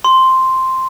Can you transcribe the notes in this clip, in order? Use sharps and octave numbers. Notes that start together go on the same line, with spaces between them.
C6